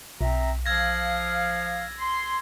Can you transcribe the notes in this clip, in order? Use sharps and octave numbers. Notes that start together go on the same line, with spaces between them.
B1 C4 E5 A#5
F3 F5 E6 G#6 A#6
C6